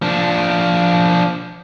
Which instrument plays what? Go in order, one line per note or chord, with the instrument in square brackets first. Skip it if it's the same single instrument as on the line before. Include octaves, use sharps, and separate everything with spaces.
[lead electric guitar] F3 D4